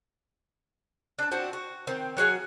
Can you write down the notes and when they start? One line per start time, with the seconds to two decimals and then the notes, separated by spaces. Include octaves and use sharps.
1.19 D4 A5
1.32 C4 D4 F#4
1.53 F#4
1.87 D#3 C4
2.17 F#3 F#4 G#4 F5